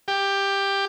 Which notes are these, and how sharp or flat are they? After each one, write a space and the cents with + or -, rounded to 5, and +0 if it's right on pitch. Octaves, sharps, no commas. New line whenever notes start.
G4 +10